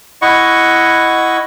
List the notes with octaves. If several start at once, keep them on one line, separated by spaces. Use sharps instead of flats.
E4 D#5 F#5 C#6